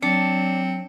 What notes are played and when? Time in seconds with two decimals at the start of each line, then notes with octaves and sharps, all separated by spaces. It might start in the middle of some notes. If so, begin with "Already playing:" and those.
0.02 F#3 C4 D4 C#7